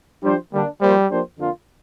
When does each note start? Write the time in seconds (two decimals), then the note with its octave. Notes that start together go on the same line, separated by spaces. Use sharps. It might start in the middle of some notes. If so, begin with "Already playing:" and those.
0.24 F3 G3 D4 G4 C5
0.53 D3 G3 A#3 D4
0.81 F3 G3 A#3 G4 C5
1.09 F3 A#3 D4 G4 C5
1.38 F2 D3 A#3 D4 F4